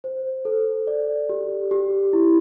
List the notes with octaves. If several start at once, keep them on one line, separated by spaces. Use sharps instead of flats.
C5
A4
D5
G4
G4
E4